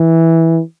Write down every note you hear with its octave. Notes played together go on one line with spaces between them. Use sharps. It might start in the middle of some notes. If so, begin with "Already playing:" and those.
Already playing: E3